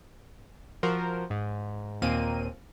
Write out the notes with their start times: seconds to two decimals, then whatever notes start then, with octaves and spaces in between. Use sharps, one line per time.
0.83 F3 F#4 A#4 C5
1.30 G#2
2.02 D#2 A#2 A#3 C4 D#7